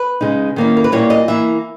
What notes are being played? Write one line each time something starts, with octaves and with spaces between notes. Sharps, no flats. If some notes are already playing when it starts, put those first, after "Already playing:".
Already playing: B4
C#3 G#3 D#4
D#3 A#3 C#4 E4
A#4
B4
A#2 G3 A#3 E4 C#5
D#5
E3 A#3 E4 E5